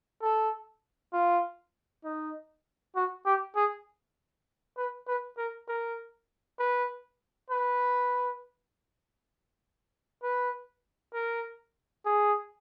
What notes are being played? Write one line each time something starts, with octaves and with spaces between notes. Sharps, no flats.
A4
F4
D#4
F#4
G4
G#4
B4
B4
A#4
A#4
B4
B4
B4
A#4
G#4